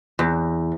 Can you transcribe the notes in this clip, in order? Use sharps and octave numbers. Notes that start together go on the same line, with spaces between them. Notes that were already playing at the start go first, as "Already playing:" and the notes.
E2